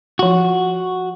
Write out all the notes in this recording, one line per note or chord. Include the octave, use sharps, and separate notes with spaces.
F3 F4 F#4